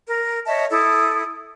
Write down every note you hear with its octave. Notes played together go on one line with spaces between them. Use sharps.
A#4
C#5 D#5 E5 A5
E4 A4 D#6